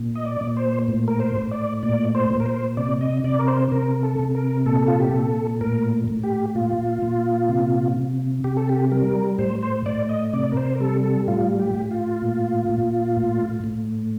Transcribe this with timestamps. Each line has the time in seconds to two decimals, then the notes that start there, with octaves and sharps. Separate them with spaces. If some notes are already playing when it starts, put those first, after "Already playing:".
Already playing: A#2
0.15 D#5
0.25 D5
0.41 A#2
0.57 C5
0.88 A2
1.08 A#4
1.20 C5
1.35 A2
1.51 D5
1.83 A#2 D5
2.15 C5
2.30 A#2
2.40 A#4
2.46 C5
2.77 C3 D5
3.01 D#5
3.24 C3 D5
3.39 A#4
3.48 C5
3.72 C3 A#4
4.03 A4
4.19 C3
4.35 A#4
4.66 A#2 A4
4.88 F4
5.00 G4
5.14 A#2 A4
5.61 A2 A#4
6.08 A2
6.23 G4
6.55 A#2 F4
7.02 A#2
7.49 C3
7.97 C3
8.44 C3 G4
8.57 A4
8.69 G4
8.91 G3 A#4
9.38 A2 C5
9.63 C5
9.86 A2 D5
10.09 D#5
10.33 C3 D5
10.52 A#4
10.57 C5
10.75 A#4
10.80 G3 A4
11.04 A4
11.28 A2 F4
11.59 G4
11.75 A2
11.91 F4
12.22 A#2
12.69 A#2
13.17 A2
13.64 A2